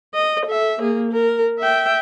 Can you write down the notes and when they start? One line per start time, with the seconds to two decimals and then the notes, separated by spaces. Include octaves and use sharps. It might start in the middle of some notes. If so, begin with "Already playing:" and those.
0.14 D#5
0.46 A4 E5
0.80 A#3 G#4
1.12 A#4
1.59 E5 G5